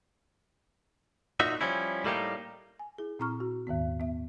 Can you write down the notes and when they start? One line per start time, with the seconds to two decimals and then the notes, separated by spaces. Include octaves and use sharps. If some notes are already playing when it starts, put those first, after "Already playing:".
1.40 A#2 D#4 F#4 E5
1.61 F3 G3 C#4 E4
2.04 A2 G3 A3 A#3 D#4 G4
2.79 G#5
2.98 E4 G#4
3.19 A#2 C4 E4 A#5 C#6 F6
3.40 F#4
3.67 D#2 G#2 D#3 B3
4.00 B3 E5